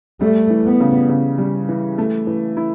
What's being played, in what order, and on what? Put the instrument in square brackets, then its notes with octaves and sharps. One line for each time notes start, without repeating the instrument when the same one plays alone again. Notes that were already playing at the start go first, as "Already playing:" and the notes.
[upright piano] G3 [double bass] A3
[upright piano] E3
[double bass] B3
[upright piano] C#3
C#3
G3
E3
A3
E3
E4